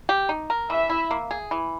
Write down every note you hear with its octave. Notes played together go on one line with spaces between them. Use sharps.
G4
D#4
A#4
E3 E5
E4
A#3
G#4
E3